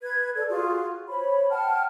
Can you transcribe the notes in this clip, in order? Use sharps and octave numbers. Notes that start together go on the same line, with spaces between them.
B4 G#6
A4 D5
F4 F#4 G#4
C5 C#5 B5
F#5 G5 A5 F6